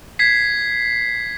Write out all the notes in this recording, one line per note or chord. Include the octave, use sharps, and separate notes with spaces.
G#6 B6 C7